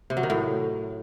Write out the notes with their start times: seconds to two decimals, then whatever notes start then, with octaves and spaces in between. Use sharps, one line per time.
0.10 C3
0.17 F#3
0.23 D#3
0.30 A2